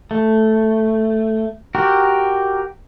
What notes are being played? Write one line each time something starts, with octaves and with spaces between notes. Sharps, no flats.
A3
F#4 G4 A#4